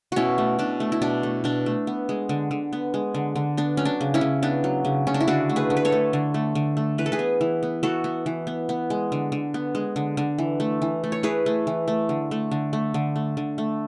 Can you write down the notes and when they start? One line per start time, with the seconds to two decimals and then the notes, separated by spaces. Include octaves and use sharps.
0.12 B2 C#4 E4 F#4
0.38 A3
0.59 B2 D4
0.80 A3
0.92 E4
1.02 B2 D4
1.23 A3
1.44 B2 D4
1.66 A3
1.87 B3
2.09 G#3
2.29 D3
2.51 D3
2.73 B3
2.94 G#3
3.14 D3
3.36 D3
3.57 B3 D4
3.77 F#3 C#4
3.85 D4
4.01 C#3
4.14 C#4 E4
4.21 C#3
4.43 B3 D4
4.64 F#3
4.85 C#3
5.07 C#3 C#4
5.14 D4
5.21 E4
5.27 D3 D4 F#4
5.49 A3
5.56 G#4 B4
5.70 D3
5.77 B4
5.85 A4 C#5
5.92 A3
6.13 D3
6.34 A3
6.55 D3
6.77 A3
6.98 E3 B4
7.06 A4
7.12 G#4 B4
7.19 B3
7.41 E3
7.63 B3
7.83 E3 F#4 A4
8.04 B3
8.26 E3
8.47 B3
8.69 B3
8.90 G#3
9.12 D3
9.32 D3
9.54 B3
9.75 G#3
9.96 D3
10.17 D3
10.38 E3
10.60 A3
10.82 E3
11.04 A3
11.12 C#5
11.23 E3 G#4 B4
11.46 A3
11.67 E3
11.88 A3
12.09 D3
12.31 A3
12.51 D3
12.73 A3
12.94 D3
13.16 A3
13.37 D3
13.58 A3